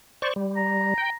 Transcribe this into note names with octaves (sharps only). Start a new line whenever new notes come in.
C5 D5 C#6
G3
A#5
G5